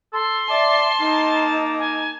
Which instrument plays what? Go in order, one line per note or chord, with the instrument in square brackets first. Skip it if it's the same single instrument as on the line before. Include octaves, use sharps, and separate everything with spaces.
[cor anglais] A4 [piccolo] C6
[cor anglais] D5 [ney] E5 [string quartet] A5
[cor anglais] A#3 [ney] D#4
[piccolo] G#5